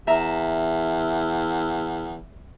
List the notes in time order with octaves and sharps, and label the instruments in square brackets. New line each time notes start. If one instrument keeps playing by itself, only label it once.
[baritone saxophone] E2 [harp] E5 A#5